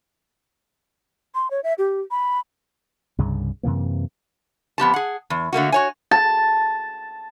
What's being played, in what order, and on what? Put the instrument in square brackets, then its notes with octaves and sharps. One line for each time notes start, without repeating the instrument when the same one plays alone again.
[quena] C6
C#5
E5
G4
B5
[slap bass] C2 G2 C#3
F#2 C3 E3 A#3
[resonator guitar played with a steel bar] F2 B3 G4 A5
G#4 F#5
E2
D3 A3 A#3 F#4
F#4 C#5 G#5
[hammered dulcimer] A5